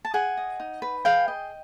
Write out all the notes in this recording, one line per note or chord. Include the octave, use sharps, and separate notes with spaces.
A5
G#4 F#5 G#5
D#5
D#4
B4
G#4 F5 G5
D#5